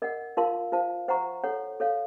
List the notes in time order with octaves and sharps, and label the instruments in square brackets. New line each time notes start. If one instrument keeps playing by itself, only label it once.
[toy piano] A#4 D#5 F#5
F4 A#4 F5 A5 C6
F4 C5 F5 A5
C5 F#5 A#5 C#6
A4 C#5 F#5
A4 C#5 F5